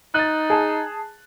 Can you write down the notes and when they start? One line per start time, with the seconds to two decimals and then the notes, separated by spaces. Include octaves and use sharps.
0.14 D#4 F#6 A6
0.50 G#4 A5